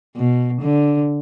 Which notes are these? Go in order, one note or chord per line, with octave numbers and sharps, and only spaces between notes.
B2
D3